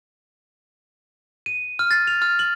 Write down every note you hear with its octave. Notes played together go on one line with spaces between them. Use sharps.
D#7
F6
A6
F7
F6
F#7